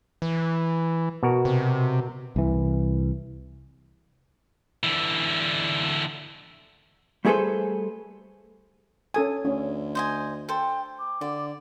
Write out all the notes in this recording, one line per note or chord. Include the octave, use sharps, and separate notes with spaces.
E3
B2 F#4 A#4
C3
C2 E3
D3 E3
G3 A3 G#4 A4 B4 C5
C#4 A4 G#5 D#6
D2 C#4
C5 D#5 G#5
A4 C5 G5
D6
D3 D5